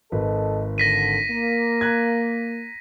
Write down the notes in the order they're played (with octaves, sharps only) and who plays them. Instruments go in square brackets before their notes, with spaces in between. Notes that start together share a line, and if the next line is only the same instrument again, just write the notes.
[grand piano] G#1 B4 [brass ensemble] A4 D#5
[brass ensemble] D3 [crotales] A#6 B6 D#7
[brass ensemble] A#3
[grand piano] A#5 F#6 G#6